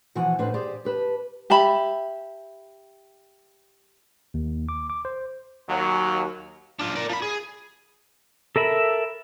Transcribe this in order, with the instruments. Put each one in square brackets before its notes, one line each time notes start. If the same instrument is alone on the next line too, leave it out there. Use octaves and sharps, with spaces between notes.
[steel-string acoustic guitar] B2 E3 F3 F#4 F#5 G#5
A2 D4 B4 C5
G4 G#4 C5 D5
G4 B4 A5
[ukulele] G4 E5 A5 B5
[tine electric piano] D#2
D6
D6
C5
[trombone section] D#2 F#3
[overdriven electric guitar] D4 F4
A#4 D5
F3 B5
G#4
[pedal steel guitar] A4 A#4 E5 B5